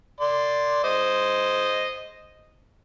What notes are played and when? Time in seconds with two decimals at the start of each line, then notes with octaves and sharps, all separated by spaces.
0.20 D5 C6
0.84 C5 D#5